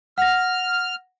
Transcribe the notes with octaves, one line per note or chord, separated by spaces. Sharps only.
F#5 F6 A#6